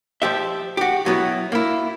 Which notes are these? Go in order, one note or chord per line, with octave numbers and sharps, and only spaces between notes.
F3 G4 E5
F#4 G4
F#3 B3 E4
A#3 E4